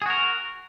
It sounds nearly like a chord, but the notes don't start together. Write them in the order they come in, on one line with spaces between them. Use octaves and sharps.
G#4 F#4 A#4